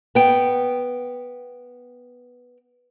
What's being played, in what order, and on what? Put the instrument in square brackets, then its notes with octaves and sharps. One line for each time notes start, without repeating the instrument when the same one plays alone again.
[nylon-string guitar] B3 G5